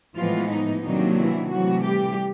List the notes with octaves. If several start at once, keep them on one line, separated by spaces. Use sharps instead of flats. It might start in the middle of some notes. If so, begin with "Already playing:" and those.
A2 E3 F3 G#3 B3 F4
D#4
C3 D#3 F#3 A#3 D4 D#4
E3 E4
C3 E3 F#3 A3 F#4
G3 G4